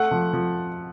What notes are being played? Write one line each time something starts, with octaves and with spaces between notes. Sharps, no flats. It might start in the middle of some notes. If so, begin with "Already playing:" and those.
Already playing: A3 F#5
F3
F3